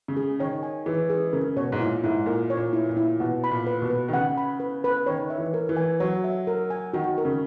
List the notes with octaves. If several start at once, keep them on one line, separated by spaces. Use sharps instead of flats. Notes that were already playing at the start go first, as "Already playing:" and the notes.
C#3
G#4
D#3 C#5
G#5
E3 G#4
G#4
C#3 A#4
B2 C#5
G#2
A#2 E4
G#2 E4
A#2 A#4
C#5
A#2
E4
A#2
E4
B2 F#5
B5
A#2
B4
B2
B4
D#3
C#3 F#5
B5
B4
B4
D#3 C#5
E5
E3
A#4
E3
G#5
F#3 C#5
E5
A#4
G#5
D#3 F#4
A#4
C#3